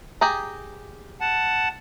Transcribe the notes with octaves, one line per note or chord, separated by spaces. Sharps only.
G4 G#4 A#5
F#5 A5